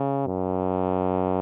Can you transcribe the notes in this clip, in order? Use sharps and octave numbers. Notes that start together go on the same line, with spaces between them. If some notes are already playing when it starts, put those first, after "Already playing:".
Already playing: C#3
F#2